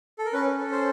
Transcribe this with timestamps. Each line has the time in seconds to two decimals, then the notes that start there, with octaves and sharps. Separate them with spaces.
0.18 A4
0.25 A#4
0.33 C#4 B4
0.58 A4
0.72 C5